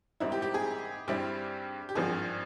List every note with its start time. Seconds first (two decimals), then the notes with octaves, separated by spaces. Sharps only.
0.20 G#1 G#2 G3 C4 E4
0.32 G4
0.42 G4
0.54 G#4
1.08 G2 G3 C4 E4 G4
1.89 G4
1.95 G#1 G2 F3 C4 G#4